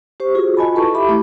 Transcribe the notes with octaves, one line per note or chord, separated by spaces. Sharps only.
G4 C5 C#6
F4 F#4 G#4
F4 F#4 D#5 G#5 A5 B5
E4 A4 B4 A5 C#6
G4 E5 B5 D6
A3 E4